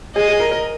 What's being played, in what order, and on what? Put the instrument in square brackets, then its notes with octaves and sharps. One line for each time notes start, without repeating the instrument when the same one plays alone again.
[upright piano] G#4 [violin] D#5
[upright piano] G#4
A#4
A#4